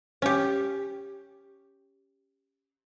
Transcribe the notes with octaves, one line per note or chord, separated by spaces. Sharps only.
C#4 G4